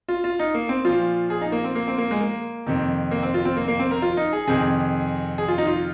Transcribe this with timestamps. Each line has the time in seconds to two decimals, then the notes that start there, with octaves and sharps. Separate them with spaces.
0.08 F4
0.24 F4
0.39 D#4
0.54 A#3
0.69 C4
0.85 A#2 F3 F4
1.30 G#4
1.41 D#4
1.52 A#3
1.64 C4
1.75 A#3
1.88 C4
1.98 A#3
2.11 G#3
2.21 A#3
2.67 F2 C3 D#3
3.11 A#3
3.23 C4
3.34 F4
3.45 C4
3.57 A#3
3.68 A#3
3.80 C4
3.91 A#4
4.02 F4
4.17 D#4
4.33 G#4
4.48 F2 C3 D#3 G#4
5.38 G#4
5.48 F4
5.58 D#4
5.67 F4